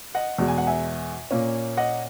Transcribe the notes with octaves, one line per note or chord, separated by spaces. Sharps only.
D#5 F#5
E2 B2 G#3
G#5
F#5
E5 G#5
A#2 A#3 C#4
D#5 F#5